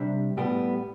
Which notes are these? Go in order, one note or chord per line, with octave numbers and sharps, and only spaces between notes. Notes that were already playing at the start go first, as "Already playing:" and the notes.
Already playing: C3 G3 D4 E5
A2 G3 B3 G5